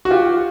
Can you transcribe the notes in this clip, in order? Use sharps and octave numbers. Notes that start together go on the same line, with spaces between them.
F#4
F4 G4